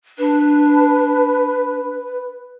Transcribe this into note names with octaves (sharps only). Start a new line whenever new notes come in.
D4 B4